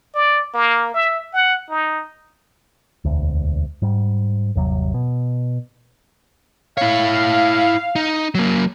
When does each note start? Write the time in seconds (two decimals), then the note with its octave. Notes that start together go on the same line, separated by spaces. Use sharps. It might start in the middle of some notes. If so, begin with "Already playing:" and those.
0.15 D5
0.54 A#3
0.94 E5
1.33 F#5
1.70 D#4
3.05 E1 D2
3.82 G#2 G3
4.55 G1 D#2 C3 F#3
4.94 B2
6.78 E4 C#5 F5
7.96 D#4
8.35 F#3 A#3